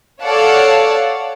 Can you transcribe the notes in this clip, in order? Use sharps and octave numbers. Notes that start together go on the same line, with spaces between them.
A4 C#5 D5 F5 F#5 A5